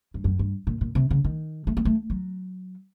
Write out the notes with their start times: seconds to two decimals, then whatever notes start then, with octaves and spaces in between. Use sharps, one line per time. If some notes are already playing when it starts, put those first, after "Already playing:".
0.14 G2
0.24 F#2
0.39 G2
0.67 A#2
0.81 A#2
0.95 C3
1.11 C#3
1.24 D#3
1.67 A3
1.77 A#3
1.85 A3
2.10 F#3